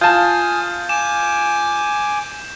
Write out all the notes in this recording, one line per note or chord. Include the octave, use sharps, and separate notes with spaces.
F4 G#5 A5 D#6 G6
G#5 D6 E7